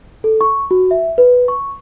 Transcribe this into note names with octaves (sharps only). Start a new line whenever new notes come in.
A4
C#6
F#4
E5
B4
C#6